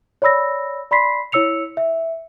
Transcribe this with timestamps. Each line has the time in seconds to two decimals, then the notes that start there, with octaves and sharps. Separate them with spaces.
0.22 C#5 D5 B5 E6 A#6
0.91 D5 B5 C6 B6 C7
1.32 E4 C#5 E6 C#7 F7
1.77 E5